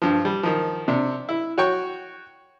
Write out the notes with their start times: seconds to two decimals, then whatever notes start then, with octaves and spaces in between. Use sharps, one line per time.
0.02 G2 F3
0.25 G3
0.43 D#3 F3
0.88 C3 D4
1.29 E4
1.58 F#4 C#5 G5 C#6